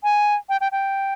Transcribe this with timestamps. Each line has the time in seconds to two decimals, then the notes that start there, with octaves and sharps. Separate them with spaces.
0.04 G#5
0.49 G5
0.61 G5
0.72 G5